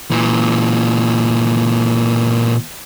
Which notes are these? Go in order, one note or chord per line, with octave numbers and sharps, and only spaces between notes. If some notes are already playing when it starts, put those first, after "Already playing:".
A#2 E3